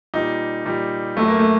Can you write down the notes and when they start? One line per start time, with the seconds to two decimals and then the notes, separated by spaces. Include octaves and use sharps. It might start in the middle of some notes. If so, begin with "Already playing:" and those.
0.14 A#2 G3 D#4
0.65 A#2 G3
1.17 F#2 F#3 A3
1.28 A#3
1.39 A3